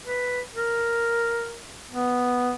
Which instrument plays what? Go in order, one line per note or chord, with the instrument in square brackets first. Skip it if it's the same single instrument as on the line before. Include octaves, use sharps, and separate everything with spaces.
[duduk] B4
A#4
B3